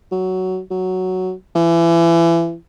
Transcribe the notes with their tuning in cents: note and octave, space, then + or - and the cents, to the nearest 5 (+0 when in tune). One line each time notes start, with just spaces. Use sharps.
F#3 +10
F#3 +5
E3 +30